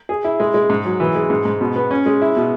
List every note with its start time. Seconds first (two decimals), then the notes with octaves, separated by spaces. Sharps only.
0.09 G#4
0.24 E4
0.40 G#3
0.54 G#3
0.70 G#2
0.85 F#3
1.00 E3
1.15 G#3
1.30 G#2
1.45 G#2
1.61 B2
1.76 B3
1.91 C#4
2.06 G#3
2.21 E4
2.37 B2